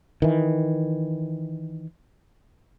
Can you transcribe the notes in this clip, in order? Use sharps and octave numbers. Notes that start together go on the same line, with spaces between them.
D#3 E3